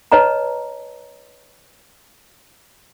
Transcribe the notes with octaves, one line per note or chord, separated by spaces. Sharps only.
B4 C#5 D#5 A5 A#5